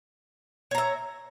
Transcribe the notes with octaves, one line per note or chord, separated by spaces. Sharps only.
C#5 E5 A#5